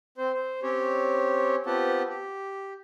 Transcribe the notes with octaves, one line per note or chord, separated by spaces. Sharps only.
C4 C5
C5
C4 C#4 G4 C#5
B3 C4 F4 G4 F#5 A5
G4